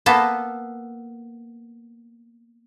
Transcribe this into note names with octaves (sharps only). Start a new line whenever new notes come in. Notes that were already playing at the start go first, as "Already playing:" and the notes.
A#3 B3 A4